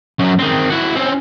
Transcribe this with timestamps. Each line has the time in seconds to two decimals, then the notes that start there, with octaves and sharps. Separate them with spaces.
0.19 F#2 F#3
0.39 D#3 C4
0.70 E4 F#4
0.96 C4 C#4